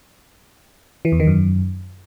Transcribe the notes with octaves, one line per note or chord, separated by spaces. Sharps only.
E3
E2
D#3
F#2